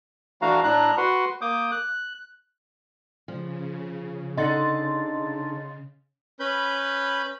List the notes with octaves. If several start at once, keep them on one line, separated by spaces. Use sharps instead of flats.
E3 A3 D4 F#4 F5 A#5
A2 D4 A#5 F#6
F#4 B4 F#5 C6
A#3 D6 D#6 G6
F#6
C#3 F3
D3 D#4 D#5 F#5 C6 A6
C#4 B4 B5 G6